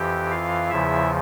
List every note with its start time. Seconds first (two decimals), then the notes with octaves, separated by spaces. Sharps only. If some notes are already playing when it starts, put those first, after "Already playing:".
Already playing: F2 E3 G4 G5
0.30 F4 F5
0.70 E2 C#3 F3 E4 E5